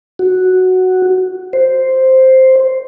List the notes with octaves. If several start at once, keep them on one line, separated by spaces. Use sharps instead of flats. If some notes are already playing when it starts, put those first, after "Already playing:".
F#4
C5